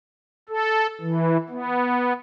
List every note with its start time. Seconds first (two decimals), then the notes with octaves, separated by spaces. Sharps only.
0.49 A4
1.01 E3
1.49 B3